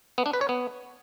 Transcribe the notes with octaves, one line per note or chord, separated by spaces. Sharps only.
B3
D4
B4
C#5
B3